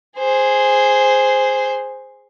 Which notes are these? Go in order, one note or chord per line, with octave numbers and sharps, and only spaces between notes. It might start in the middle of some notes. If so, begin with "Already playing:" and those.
G#4 C5